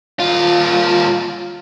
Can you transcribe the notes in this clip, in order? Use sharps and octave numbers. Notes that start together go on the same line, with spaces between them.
D#2 F4